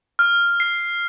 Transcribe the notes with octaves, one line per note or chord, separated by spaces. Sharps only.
F6
C7